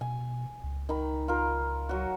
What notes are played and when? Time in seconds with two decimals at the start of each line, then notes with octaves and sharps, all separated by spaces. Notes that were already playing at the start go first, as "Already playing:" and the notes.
0.01 B2 G#5
0.64 C#2
0.89 D#3 B5
1.28 F4 A#4
1.89 F#3 F#4